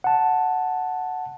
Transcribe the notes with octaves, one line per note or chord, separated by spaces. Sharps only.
F#5 A5